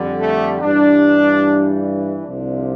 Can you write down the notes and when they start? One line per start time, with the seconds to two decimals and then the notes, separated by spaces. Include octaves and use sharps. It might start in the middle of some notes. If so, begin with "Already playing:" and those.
Already playing: F2 D3 G3
0.21 A3
0.61 G2 E3 G3 D4
2.24 C2 C3 F3 D4